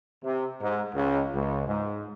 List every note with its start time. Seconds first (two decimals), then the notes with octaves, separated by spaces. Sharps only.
0.23 C3
0.62 G#2
0.95 C#2
1.34 C#2
1.67 G#2